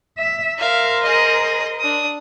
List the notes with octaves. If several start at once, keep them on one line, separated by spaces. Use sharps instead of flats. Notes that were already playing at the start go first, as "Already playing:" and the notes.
E5
A#4 C5 E5 F5
G#4 D#5
D4 D#6